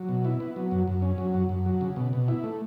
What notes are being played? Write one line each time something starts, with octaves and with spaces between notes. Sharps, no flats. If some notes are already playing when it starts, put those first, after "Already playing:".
Already playing: F#3
B2
E4
B3
F#3
F#2
F#2
C#4
F#3
F#2
F#2
F#3
C#3
B2
B2
E4
A3